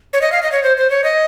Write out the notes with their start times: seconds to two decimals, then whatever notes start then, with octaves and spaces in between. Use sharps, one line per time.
0.13 C#5
0.21 D#5
0.32 F5
0.43 D#5
0.52 C#5
0.63 C5
0.77 C5
0.90 C#5
1.04 D#5